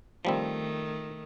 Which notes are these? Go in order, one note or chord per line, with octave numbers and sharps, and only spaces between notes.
D#3 F3 G3 A3 C4